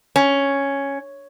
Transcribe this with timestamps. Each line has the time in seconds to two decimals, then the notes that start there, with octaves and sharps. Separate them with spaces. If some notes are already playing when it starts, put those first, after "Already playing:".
0.16 C#4